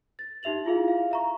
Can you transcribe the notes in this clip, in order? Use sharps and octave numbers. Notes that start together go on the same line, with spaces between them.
A6
D#4 G4 E5 F7 F#7
E4 F4 G#4 F5
F5
E5 A#5 C#6